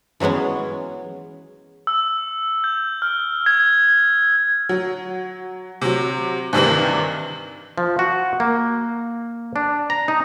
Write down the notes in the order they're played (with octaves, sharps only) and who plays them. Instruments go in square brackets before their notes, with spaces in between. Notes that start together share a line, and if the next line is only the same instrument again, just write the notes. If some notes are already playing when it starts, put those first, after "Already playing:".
[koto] E3 F#3 G#3 B3 C#4
[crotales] E6
G6
F6
G#6
[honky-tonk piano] F#3
C3 F#3
G2 C3 D#3 E3
[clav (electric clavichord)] F3
F#4
A#3
D4
A#5
D#4